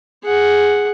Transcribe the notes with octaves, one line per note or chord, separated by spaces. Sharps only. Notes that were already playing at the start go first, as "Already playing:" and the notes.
G#4 F#5